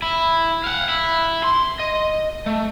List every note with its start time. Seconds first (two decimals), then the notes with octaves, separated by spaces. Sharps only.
0.02 E4
0.64 F5 F#5
0.88 E4
1.44 C6
1.80 D#5
2.46 A3